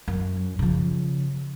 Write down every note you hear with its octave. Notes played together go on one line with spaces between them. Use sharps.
F#2
C#3 F3